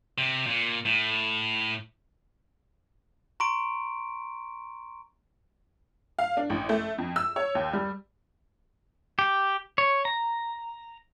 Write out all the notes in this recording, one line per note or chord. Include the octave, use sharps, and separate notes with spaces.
C3
A#2
A2
A#5 C6 C#6 D7
F5
D4
A1
A3
F2
E6
C#5
D#2
G3
G4
C#5
A#5